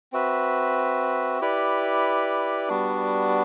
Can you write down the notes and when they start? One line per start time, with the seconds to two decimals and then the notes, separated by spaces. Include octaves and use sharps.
0.12 C4 F#4 B4 E5
1.41 E4 G4 B4 D5
2.69 G3 B3 D4 F#4